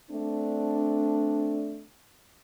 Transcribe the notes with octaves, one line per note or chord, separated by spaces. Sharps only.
A3 C4 D4